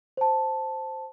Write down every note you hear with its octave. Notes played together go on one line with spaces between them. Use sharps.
C5 A5